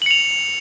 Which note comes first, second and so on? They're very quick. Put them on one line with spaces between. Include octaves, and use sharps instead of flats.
F#7 C#7 F7